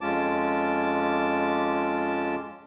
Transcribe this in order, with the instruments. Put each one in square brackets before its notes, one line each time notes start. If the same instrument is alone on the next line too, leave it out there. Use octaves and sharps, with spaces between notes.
[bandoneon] F2 G#3 C#4 F4 A5 D6